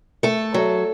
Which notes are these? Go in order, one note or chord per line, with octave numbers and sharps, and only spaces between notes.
A3 A4
F#3